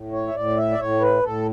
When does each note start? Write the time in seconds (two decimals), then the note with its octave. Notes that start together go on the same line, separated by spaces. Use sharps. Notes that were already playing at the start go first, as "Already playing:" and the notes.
Already playing: A2
0.12 C#5
0.28 E5
0.35 A2 D5
0.57 E5
0.71 D5
0.79 A2 C#5
1.01 B4
1.23 A2 A4